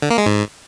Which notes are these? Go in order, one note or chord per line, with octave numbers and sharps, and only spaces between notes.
D3
A#3
G#3
G#2